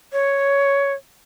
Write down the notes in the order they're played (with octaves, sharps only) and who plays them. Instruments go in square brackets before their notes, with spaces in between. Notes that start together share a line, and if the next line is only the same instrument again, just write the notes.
[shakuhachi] C#5